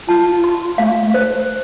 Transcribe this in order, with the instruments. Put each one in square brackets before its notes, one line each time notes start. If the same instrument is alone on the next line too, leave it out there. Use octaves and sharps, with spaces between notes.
[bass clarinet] F4 [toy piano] A5
[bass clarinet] F4
[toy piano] C6
[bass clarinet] A3 [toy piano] F5
[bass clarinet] A3
[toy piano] C5